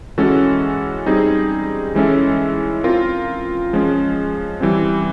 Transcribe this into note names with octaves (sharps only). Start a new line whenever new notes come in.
E3 G#3 C#4 F#4 A4
G3 C4 D#4 G#4
E3 G#3 C#4 E4 A4
C4 F4 A#4
F3 G#3 C#4
E3 G3 C4